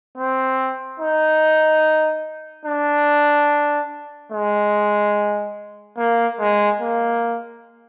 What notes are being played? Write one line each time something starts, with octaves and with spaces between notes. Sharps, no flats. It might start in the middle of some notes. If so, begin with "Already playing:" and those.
C4
D#4
D4
G#3
A#3
G#3
A#3